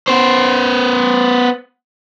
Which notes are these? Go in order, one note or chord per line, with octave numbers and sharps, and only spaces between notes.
B3 C5